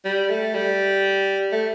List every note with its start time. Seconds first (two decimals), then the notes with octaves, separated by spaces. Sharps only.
0.05 G3
0.30 A3
0.55 G3
1.52 A3